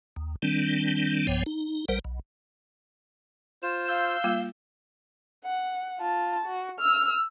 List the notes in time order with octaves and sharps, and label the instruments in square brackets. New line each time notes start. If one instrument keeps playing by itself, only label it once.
[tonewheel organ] D#2
D#3 G3 C4 D4
B1 G2 F3 B3 C#5 G5
D#4
A#1 G3 A#4 C5 F#5
B1
[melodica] F4 C5 [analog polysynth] E7
[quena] F5 [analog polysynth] E6 G6
[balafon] G3 A#3 F4
[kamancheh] F#5
F4 A5
F#4
E6 F6